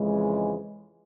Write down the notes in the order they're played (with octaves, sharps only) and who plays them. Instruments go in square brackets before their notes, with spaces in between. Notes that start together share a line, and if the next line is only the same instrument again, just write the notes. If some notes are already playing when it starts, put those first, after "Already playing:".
Already playing: [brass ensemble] F2 C#3 E3 G#3